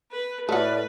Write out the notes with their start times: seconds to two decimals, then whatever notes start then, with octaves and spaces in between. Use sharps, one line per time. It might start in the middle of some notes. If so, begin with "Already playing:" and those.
0.11 B4
0.49 A2 A3 F#4 B4 D5 F6